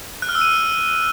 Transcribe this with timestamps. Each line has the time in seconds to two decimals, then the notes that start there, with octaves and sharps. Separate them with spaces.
0.22 F#6
0.29 F6
0.35 E6
0.41 D#7